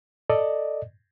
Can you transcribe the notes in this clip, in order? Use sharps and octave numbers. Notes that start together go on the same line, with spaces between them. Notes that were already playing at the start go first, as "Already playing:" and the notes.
A4 D5 D#5